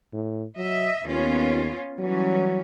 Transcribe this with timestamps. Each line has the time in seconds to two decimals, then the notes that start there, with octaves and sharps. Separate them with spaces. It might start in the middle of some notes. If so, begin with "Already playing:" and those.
0.13 A2
0.57 F#3 D#5 E5
1.06 D#2 B3 C#4 F4
1.99 E3 F#3 G3 C#4